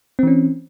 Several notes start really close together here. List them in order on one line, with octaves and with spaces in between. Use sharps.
C4 E3 C#4